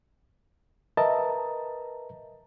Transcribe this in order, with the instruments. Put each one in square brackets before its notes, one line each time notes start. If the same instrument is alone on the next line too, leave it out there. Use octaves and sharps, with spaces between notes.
[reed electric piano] A#4 B4 D#5 E5 A5 A#5